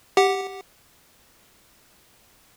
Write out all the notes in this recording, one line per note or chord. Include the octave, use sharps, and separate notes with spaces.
G4 F#5